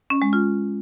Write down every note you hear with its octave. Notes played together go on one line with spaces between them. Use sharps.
C#4
G#3
F4